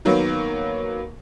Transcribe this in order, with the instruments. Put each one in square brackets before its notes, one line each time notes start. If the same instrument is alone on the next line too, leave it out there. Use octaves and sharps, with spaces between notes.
[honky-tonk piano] D#3 F#3 A#3 B3